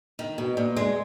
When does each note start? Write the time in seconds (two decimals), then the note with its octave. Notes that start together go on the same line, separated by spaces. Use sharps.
0.19 D#3
0.38 B2
0.57 A#2
0.76 G#3